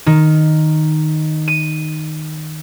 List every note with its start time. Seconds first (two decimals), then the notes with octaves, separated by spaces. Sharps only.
0.06 D#3
1.48 D#7